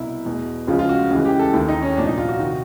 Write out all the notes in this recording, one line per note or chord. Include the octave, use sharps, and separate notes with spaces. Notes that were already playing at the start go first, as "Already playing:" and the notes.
Already playing: C2 B2 E4
E2 B2
C#2 C#3 F3 F4
F4
F#4
C#2 C#3 E3
G4
A4
D#2 D#3 E4
D#4
C#4
C2 A#2 F3 D4
D#4
F4
F#4
C3 D#3